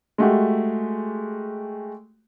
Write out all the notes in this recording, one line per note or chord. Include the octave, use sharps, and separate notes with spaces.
G#3 A3 F#4 G4